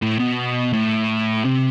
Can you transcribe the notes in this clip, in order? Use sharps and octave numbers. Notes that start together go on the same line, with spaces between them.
A2
B2
A2
C3